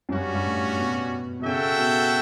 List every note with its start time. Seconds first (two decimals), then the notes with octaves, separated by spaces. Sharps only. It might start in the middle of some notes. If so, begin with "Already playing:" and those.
0.09 F#2
0.12 G2 G3 C#4 F#4
0.34 G2
0.46 A2
0.79 B2
1.40 B2
1.45 C#3 F#4 A4 E5 G5
1.78 B2